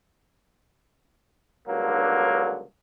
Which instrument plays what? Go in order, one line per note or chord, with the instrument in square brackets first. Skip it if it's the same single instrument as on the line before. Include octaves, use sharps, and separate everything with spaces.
[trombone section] C#2 G2 D3 F#3 A#3